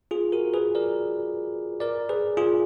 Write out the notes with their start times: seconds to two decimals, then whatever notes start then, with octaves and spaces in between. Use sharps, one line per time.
0.11 F4 G#4
0.32 F#4 A#4
0.54 G#4 B4
0.75 A#4 D5
1.80 A#4 D5
2.09 G#4 B4
2.37 F4 G#4